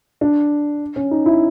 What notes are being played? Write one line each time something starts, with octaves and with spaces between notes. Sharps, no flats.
D4
C#4
D#4
E4